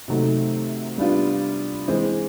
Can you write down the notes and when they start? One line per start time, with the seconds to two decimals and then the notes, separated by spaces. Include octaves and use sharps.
0.08 C3 D#3 F#3 A3
0.98 G3 B3 D4 F4
1.88 E3 G#3 C4